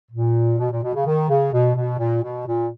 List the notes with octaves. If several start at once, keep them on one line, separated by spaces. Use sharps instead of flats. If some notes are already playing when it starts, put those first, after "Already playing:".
A#2
B2
A#2
B2
C#3
D#3
C#3
B2
B2
A#2
B2
A#2